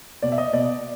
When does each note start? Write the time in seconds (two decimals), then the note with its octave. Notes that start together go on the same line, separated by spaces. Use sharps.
0.22 B2 D5
0.32 E5
0.38 D#5
0.53 B2 D5